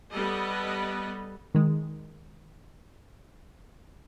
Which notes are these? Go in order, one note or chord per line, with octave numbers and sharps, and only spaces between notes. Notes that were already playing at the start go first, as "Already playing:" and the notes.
G3 B3 A4 B4 D#5
D#3 G#3